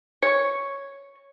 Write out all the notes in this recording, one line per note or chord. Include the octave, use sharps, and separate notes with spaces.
C#5 C#6 C#7